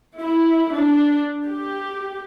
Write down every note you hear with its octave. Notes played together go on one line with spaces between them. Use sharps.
E4
D4
G4